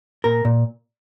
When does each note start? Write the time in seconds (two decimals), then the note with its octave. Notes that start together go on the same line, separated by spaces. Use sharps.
0.24 A#2 A#4
0.45 A#2